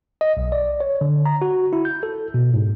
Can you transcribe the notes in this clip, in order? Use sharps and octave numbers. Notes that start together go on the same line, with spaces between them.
D#5
B1
D5
C#5
D3
A#5
F#4
E4
G6
A4
B2
G#2